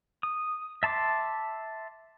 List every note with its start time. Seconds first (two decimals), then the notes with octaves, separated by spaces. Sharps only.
0.23 D#6
0.83 E5 A5 C6 D6